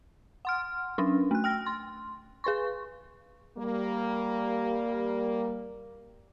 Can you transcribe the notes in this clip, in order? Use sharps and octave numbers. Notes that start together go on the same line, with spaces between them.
F#5 C6 F6
F#3 C#4 D4
A3 F#6
G5 F6 A#6
C6
G#4 B4 C6 C#6
G3 A#3